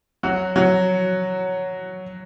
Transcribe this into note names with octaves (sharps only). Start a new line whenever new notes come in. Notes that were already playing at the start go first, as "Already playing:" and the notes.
F#3 F#4
F#3 F#4